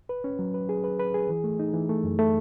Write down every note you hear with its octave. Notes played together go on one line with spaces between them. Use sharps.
B4
C#4
F#3
B4
G#4
B4
B4
G#4
E3
A3
D#4
E3
A3
F#2
A3